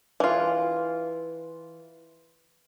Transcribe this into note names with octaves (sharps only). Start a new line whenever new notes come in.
E3 F4